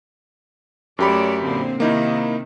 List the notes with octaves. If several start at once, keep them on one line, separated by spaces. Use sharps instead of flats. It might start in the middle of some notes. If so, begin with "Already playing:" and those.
F#2 A3 G4 C#5 D5 B5
A#2 D3 C4
C3 D#3 A#3 D#4 E4